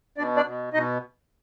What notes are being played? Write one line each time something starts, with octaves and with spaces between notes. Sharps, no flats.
B2 D4 D5
D4 D5
B2
B2 D#4 D#5